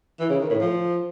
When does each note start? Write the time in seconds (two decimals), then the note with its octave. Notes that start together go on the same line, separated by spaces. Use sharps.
0.19 E3
0.30 C#3
0.40 D#3
0.50 A2
0.60 F3